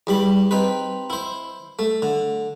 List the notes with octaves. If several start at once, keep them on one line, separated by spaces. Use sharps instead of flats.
E2 G3 B5
C4 D#4 B4
E4 C5
A3
D3